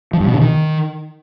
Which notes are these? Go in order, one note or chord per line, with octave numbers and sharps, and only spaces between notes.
F3
G2
B2
D3
D#3